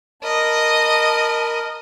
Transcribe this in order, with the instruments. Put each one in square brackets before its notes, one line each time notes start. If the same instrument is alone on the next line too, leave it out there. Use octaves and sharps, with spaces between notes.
[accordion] A#4 B5 [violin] D#5 [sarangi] A5